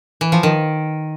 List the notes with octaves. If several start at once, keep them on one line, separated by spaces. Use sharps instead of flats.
E3
F3
D#3